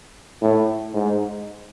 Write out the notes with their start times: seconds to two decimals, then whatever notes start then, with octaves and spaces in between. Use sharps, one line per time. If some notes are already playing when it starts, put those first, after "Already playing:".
0.42 A2
0.94 G#2